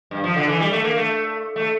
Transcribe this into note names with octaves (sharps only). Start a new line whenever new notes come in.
G2
F3
D3
E3
G3
A3
A#3
A3
A3